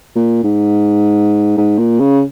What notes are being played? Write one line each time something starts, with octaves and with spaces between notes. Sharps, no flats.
A#2
G#2
G#2
A#2
C#3